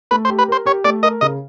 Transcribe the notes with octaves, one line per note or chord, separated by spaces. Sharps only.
A3 B4
C5
G4
B4
A#4 C5
G4 C#5
A3 D5
A#4 D#5
C#3 D#5